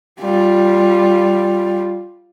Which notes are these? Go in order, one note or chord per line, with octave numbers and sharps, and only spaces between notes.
G3 F4